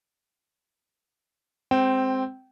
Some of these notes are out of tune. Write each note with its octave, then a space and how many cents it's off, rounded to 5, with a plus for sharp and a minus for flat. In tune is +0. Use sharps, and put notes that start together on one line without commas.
G#3 +0 C4 +0 G5 -20